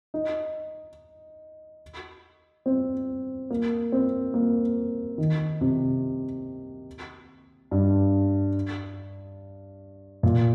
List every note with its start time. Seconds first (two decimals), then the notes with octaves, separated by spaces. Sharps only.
0.14 D#4
2.66 C4
3.51 A#3
3.92 C4
4.34 A#3
5.18 D#3
5.61 C3
7.71 G2
10.23 A#2